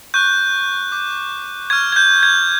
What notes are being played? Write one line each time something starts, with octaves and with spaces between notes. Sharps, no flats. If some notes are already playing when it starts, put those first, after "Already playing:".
C#6 F#6 G6
D6 G6
C#6 F6 G#6
G#6
G6
G#6